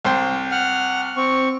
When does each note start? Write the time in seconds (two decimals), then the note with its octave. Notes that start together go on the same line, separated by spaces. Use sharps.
0.05 C2 C5 G5
0.51 F#5 F6
1.17 C4 C#6